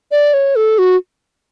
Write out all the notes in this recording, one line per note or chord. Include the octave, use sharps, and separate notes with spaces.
D5
C#5
A4
F#4